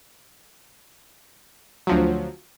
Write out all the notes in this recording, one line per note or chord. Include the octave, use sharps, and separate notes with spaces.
D2 F3 F#3